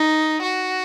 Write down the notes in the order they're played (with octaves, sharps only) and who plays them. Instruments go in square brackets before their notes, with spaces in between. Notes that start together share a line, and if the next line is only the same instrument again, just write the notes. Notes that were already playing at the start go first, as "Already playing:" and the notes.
Already playing: [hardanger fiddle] D#4
F#4